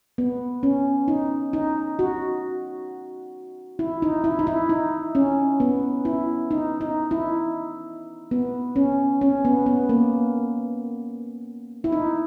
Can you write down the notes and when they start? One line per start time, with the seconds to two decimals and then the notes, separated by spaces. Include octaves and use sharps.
0.18 B3
0.63 C#4
1.08 D#4
1.53 D#4
1.99 F#4
3.79 E4
4.02 D#4
4.24 E4
4.39 D#4
4.47 E4
4.69 D#4
5.15 C#4
5.60 B3
6.05 E4
6.51 D#4
6.81 D#4
7.11 E4
8.31 B3
8.76 C#4
9.21 C#4
9.45 B3
9.66 B3
9.89 A#3
11.84 E4
11.92 D#4